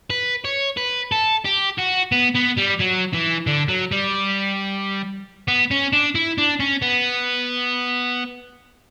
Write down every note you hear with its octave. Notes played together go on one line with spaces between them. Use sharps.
B4
C#5
B4
A4
G4
F#4
B3
B3
G3
F#3
E3
D3
F#3
G3
B3
C#4
D4
E4
D4
C#4
B3